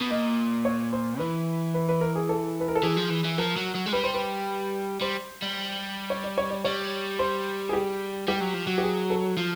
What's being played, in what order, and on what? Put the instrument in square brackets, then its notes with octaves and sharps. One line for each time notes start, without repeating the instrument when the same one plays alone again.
[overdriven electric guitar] B2
[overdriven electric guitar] A#2 [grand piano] D#5
[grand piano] C#5
C5
[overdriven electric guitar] E3 [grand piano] B4
[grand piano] B4
B4
A#4
G#4
A4
B4
A#4
A4
[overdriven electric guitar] E3 [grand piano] G#4
[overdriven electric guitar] F3
E3
E3
[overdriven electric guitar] F3 [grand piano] A#4
[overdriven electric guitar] F#3
F#3
G#3
[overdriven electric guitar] G3 [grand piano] B4
[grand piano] C5
B4
[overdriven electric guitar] G3 [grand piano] C5
[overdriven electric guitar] G3
[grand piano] C#5
D5
C#5
D5
[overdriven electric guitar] G3 [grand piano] C#5
[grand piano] C5
G#4
G4
[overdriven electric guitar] G3 [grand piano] G4
[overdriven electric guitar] F#3
F3
F#3
[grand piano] G4
G#4
A4
[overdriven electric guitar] F3